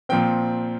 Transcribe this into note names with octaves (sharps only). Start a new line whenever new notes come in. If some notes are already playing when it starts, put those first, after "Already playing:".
A#2 F3 C4 G5